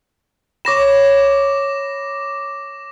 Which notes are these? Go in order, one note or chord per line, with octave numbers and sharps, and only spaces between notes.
C#5 B5 D6 A#6 E7